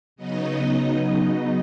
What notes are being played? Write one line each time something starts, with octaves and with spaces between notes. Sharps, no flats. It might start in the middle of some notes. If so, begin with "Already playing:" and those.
C#3 F#3 B3 D#4 D#5